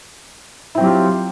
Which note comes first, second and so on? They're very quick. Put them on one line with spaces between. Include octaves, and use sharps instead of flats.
E4 C4 F#3 G4 F4